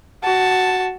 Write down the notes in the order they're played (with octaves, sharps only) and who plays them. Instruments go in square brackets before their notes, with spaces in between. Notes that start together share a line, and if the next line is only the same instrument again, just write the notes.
[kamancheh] F#4 A5